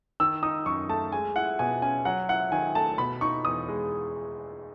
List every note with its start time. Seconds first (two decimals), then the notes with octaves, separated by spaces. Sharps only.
0.20 D#3 E6
0.43 D#4 D#6
0.66 F#2 C#6
0.89 A3 A5
1.12 G#3 G#5
1.36 E4 F#5
1.59 B2 G#5
1.82 C#4 G#5
2.05 F#3 F#5
2.29 E4 F#5
2.52 D#3 G#5
2.75 A3 A5
2.98 B2 B5
3.21 D#4 C#6
3.45 E2 D#6
3.68 G#3